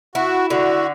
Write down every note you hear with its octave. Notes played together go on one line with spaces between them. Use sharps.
E4 F#4
D3 F#4